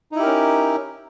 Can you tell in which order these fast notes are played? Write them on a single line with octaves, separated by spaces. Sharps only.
D#4 E4 G4 A#4 C#4